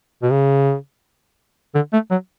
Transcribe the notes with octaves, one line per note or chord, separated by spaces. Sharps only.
B2
C#3
D3
A3
F#3